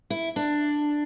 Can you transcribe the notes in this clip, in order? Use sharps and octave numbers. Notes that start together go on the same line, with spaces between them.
E4
D4